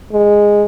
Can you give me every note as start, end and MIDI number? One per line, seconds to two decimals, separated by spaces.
0.13 0.65 56